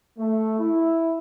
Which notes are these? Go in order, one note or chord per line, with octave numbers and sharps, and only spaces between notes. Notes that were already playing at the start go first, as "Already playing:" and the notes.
A3
E4